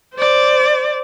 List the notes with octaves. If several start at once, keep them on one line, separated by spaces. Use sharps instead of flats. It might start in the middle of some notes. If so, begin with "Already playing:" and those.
C5 D5